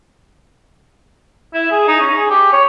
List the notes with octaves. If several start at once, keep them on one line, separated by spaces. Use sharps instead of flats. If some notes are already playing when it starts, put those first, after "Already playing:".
E4
G#4
D#4
C#4
G#4
G4
C#5